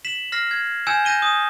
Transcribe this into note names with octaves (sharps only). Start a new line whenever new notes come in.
B6 E7 F#7
F6 A#6 C7
G#6
G#5 E6 G6 G#6 C#7 E7
G#5 G6 A#6 D#7 G7
D#6